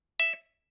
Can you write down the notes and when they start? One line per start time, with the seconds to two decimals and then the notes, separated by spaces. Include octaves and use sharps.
0.20 E5